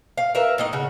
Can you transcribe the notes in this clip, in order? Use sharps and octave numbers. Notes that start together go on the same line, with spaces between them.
F5
A#4 B4 E5
A2 D#4 D#5
C#3 F#4